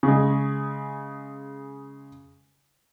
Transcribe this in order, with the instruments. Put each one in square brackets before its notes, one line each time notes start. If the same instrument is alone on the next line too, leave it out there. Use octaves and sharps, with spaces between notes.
[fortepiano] C#3 G#3